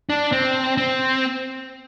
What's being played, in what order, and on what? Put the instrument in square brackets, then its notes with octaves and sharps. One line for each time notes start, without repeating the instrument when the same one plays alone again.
[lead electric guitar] D4
C4
C4